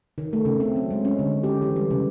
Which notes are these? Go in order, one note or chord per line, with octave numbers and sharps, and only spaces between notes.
D#3
A3
C#3
C4
F#3
G#3
C#4
D3
G4
E3
G3
C#3